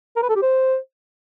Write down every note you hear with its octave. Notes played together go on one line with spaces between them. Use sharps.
A#4
B4
A4
G4
C5